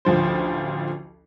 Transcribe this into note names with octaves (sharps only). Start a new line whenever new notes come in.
A1 D2 F3 C5